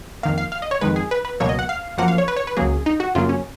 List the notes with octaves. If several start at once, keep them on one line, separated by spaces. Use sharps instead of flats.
F2 D#3 A#3 F5
F5
F5
D#5
C#5
F2 D#3 G#3 B4
G#4
B4
B4
C#2 B2 F#3 A#3 C#5
D#5
F#5
F5
F#2 F3 A#3 F#5
F5
C#5
B4
C#5
B4
C#2 C#3 F#3 A#3 G#4
D#4
F#4
F#2 C#3 F#3 A#3 F4
C#4